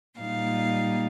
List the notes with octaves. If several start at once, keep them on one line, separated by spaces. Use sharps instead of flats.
A#2 G3 A#3 D#4 F5